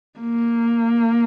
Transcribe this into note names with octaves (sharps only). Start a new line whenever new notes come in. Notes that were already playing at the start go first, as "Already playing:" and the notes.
A#3